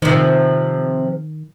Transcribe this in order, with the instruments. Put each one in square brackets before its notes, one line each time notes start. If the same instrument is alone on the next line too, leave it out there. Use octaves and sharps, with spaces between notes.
[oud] C3 F3 [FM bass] D#3